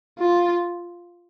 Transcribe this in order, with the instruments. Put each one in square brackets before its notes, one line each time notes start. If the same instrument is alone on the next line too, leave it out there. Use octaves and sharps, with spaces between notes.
[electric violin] F4